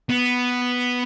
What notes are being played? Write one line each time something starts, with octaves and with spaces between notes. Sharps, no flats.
B3